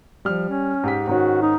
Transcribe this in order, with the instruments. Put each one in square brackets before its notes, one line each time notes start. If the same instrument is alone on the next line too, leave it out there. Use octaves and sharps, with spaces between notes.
[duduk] F3 [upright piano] G3 F6
[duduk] C#4
[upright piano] G#2 G4 B6
[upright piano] G#2 D#3 C#4 [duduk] F#4
[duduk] D#4